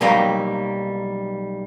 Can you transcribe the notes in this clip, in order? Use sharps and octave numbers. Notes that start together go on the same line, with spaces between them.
B1 F#3 G3 A#3 G5